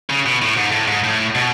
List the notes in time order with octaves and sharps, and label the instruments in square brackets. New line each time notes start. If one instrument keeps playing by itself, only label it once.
[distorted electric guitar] C#3
B2
A2
G#2
A2
G#2
A2
B2